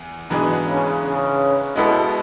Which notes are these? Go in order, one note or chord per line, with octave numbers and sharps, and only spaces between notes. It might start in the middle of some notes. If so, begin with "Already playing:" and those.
Already playing: E2
G#2 B2 D3 E3 B3 D4 G#4
C#3
C#3
B2 G#3 B3 E4 A4